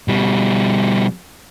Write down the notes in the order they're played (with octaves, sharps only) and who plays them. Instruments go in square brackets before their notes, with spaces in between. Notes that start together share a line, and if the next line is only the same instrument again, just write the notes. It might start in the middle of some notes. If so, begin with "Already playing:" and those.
[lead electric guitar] B2 G3